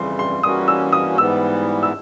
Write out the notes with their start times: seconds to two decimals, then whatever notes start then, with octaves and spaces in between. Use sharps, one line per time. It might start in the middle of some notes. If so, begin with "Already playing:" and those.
Already playing: F2 C#3 E3 G3 C6
0.19 C6
0.43 E3 G3 A#3 C#4 F#4 D#6
0.68 E6
0.93 D#6
1.18 G#2 E3 G3 B3 E6
1.83 E6